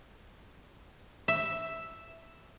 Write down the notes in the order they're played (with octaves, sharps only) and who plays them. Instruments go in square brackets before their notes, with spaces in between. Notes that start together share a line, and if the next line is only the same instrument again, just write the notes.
[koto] E5